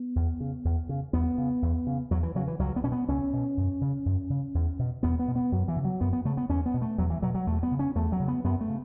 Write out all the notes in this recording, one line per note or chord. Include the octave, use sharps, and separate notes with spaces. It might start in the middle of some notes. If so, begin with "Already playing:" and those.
Already playing: B3
E2
C#3
E2
C#3
E2 B3
C#3
E2
C#3
E2 F#3
E3
C#3 F#3
E3
C#2 F#3
B3
B2 C#4
B3
C#2 C#4
B2
F#2
C#3
F#2
C#3
E2
B2
E2 B3
B3
B2
B3
F#2 F#3
E3
C#3
F#3
F#2 B3
B3
C#3 A3
B3
E2 C#4
B3
B2
A3
E2 F#3
E3
B2 F#3
F#3
E2 A3
B3
C#3
C#4
E2 A3
F#3
C#3
B3
F#2 B3
A3
C#3